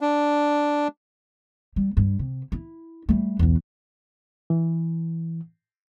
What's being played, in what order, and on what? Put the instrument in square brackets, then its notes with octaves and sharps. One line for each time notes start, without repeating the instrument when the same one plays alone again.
[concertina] D4
[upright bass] G3
G2
C3
E4
G3 A3
B1 E2
[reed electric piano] E3